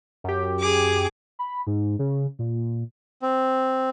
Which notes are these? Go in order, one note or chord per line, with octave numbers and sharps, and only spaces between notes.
F#2 G4
G#4 D6
B5
G#2
C#3
A#2
C4